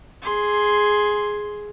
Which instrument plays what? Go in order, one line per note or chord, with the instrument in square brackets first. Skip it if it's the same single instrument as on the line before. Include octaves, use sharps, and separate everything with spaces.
[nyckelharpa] G#4 C6